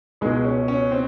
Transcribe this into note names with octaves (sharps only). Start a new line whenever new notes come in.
C#2 B2 G#3
C#4
C#4
C4